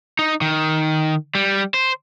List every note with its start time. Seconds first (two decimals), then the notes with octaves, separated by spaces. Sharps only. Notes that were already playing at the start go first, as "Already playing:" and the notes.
0.19 D#4
0.41 D#3
1.35 G3
1.74 C5